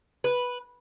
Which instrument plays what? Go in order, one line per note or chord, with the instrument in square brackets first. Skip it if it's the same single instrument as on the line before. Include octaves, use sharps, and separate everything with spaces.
[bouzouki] B4